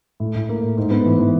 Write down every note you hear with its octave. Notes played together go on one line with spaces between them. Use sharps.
A2
A2
A#3
A2
G#2
B3
E3
E3